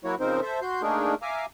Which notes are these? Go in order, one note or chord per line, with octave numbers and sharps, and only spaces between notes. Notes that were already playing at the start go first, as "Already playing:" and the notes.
F#3 A#3 E4 F#4 C#5
C#3 F3 C4 D#4 A#4 C5
A4 C5 E5
F#4 C6 G6
A3 A#3 D4 D#4 G#4 A#4
E5 F5 G#5 A#5 D6